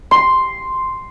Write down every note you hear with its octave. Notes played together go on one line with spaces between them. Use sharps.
C6